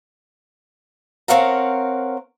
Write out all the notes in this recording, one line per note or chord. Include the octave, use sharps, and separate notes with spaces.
C4 A#4 C#5 F5 F#5 A#5